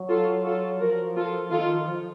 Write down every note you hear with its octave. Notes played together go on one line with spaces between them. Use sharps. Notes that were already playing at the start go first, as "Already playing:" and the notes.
Already playing: F#3
F4 A4
F4 A4
F3 F#4 A#4
F4 A4
D#3 F4 A4
F3